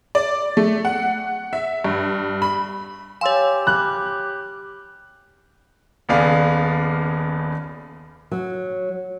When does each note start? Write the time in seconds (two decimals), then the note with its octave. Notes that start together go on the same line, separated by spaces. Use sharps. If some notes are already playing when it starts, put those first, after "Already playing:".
0.15 D5
0.57 A3
0.85 F#5
1.53 E5
1.84 G2
2.42 B5
3.21 G4 C#5 F5 G#5 C6 E6
3.67 B5 D6 F6 F#6
6.09 D#1 C#3 B3 G#4 D5 F5
8.31 F#3